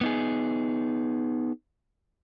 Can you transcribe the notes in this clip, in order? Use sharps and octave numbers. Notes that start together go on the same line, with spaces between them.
B3 D#4 G#4